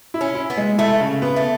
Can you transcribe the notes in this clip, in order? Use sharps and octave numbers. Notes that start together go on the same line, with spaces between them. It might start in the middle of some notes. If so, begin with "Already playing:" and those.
E4
C#4
E4
B3
G#3
A3 E4
C#3
B3
A3